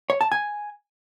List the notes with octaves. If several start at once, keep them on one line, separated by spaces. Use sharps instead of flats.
C#5
A5
G#5